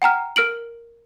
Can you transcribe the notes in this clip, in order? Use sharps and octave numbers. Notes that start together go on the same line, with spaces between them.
F#5 G5 A#5 F6
A#4 F6 D7 F#7